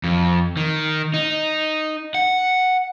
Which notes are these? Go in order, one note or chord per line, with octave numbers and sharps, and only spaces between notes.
F2
D#3
D#4
F#5